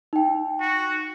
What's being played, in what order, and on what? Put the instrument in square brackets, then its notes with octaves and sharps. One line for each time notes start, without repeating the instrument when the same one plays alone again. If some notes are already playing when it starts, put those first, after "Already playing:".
[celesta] D#4 G5
[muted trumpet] F#4